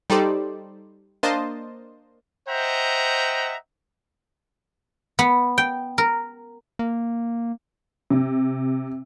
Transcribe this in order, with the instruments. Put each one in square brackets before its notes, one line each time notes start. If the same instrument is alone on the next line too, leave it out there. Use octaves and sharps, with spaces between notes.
[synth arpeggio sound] G3 D#4 G4 A4 C5 D5
A#3 D4 A#4 C5 D#5 A5
[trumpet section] C5 D#5 E5 F#5 G5 A#5
[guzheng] B3
G5
A#4
[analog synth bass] A#3
[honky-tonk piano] C3